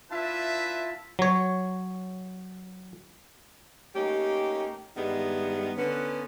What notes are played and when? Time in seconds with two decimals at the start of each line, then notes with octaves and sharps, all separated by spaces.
0.11 D4 E4 F4 B4 E5 A5
1.19 F#3 C#5
3.95 A3 A#3 C#4 D#4 G4
4.96 G2 D#3 G3 G#3 B3 E4
5.77 D3 B3 C#4